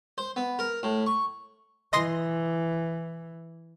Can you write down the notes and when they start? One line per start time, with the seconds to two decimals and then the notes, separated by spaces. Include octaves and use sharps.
0.18 C5
0.36 B3
0.59 A#4
0.83 A2
1.06 C#6
1.93 E3 D#5 C6 A#6